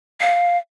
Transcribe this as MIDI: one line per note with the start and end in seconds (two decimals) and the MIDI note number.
0.21 0.58 77